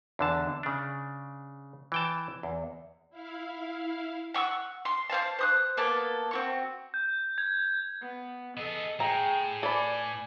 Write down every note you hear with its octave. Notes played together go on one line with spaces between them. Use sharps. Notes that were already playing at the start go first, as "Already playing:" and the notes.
E2 D3 A5
C#3 D4
E3 G5 A5
E2
E4 F5
F#5 C#6 D6 E6
C6
C5 C#5 F5 A5
C5 D#6 F#6
A#3 B3 A4 A5
C4 F#4 C#6
G6
G#6
B3
B3 G#4 A4 D#5
A2 G#4 G5 A#5
A4 B4 D5 G#5